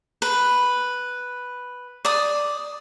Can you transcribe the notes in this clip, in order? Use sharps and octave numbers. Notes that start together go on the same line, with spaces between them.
B4
D5 D#6